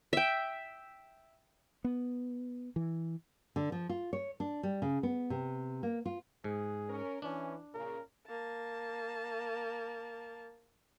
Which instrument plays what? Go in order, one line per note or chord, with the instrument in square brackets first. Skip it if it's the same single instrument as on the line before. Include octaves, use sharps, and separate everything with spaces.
[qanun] E5 G5
[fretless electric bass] B3
E3
[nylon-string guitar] D3
F3
F4
C#5
D4
G3
C#3
B3
C3
A#3
F4
[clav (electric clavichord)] G#2 [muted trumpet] G#4
[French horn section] C#4 A#4
[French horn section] E3 [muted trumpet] C#4 [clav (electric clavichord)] D4
[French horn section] A#2 C#3 [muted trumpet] A#4
[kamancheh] A#3 A5